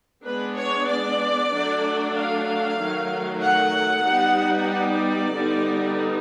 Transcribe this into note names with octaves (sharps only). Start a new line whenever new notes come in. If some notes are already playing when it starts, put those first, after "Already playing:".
G#3 B3 D4 B4
C#5
D5
F#3 A3 D4
F5
D#3 F#3 A3
F#5
G3 B3 D#4
D5
D3 G3 B3 D#4